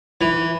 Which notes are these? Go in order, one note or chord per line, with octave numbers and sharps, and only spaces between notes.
E3